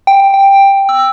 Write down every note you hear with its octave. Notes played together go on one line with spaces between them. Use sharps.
G5
G5
E6